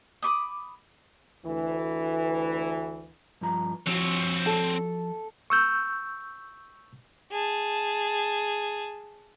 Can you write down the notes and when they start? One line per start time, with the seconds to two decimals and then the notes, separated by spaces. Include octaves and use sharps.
0.23 B5 C6 D6 D#6
1.45 D2 E3
3.41 G2 F3 A#5
3.87 F3 C4 F#4 C#5
4.46 A4
5.50 C#6 E6 G6
7.32 G#4 A5